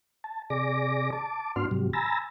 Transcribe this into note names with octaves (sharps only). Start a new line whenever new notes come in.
A5
C3 G#4 D5 D6 A#6
A5 D6
G#2 B3 D4 F#4 C6 F6
G#2 C3 F#3 G3
G#5 A#5 B5 E6 A6 A#6